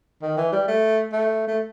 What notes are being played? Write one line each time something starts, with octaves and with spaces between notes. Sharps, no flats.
D#3
E3
G3
A3
A3
A3